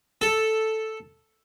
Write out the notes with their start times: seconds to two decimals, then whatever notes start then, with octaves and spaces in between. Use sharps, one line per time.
0.21 A4